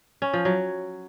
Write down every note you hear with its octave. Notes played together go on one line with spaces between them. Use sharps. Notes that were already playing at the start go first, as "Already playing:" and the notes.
C#4
F3
F#3